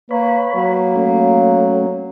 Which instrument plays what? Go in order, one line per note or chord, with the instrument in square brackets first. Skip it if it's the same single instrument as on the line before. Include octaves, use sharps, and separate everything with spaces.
[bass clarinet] A#3 [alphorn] B4 [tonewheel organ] C#5 B5
[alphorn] F#3 [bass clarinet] A#3
[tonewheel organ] A3 C#4